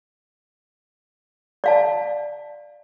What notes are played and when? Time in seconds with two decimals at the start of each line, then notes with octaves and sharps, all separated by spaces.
1.64 D5 F5 A5